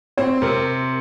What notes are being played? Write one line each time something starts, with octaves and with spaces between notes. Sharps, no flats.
C4 C#5
C3 A#4